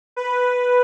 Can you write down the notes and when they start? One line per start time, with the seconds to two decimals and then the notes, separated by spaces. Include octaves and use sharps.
0.16 B4